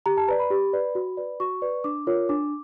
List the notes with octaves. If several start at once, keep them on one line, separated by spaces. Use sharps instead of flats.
G4 A#5
A5
B4 D5 A#5
B5
G4
B4 D5
F#4
B4 D5
F#4 C#6
B4 D5
D4 D6
F4 A#4 C#5
D4 D6